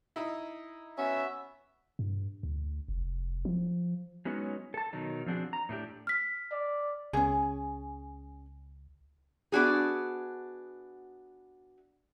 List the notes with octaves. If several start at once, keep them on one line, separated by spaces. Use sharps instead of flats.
D#4 E4
B3 C#4 F#4 E5
G2
D2
F1
F3
F#3 G#3 B3 C#4 D#4 F#4
A4 A5
B2 D#3 F#3 D#4
F3 C4 D4 F#4 G#4
A#5
A2 A3 D4 G4
F6 B6
D5
C#2 C#4 G#4
B3 D4 F#4 G#4